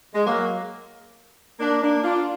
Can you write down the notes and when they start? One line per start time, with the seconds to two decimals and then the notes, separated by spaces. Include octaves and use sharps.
0.14 G#3
0.26 F#3 A#3
1.60 A#3 D4
1.82 A#3 D4
2.04 D4 F4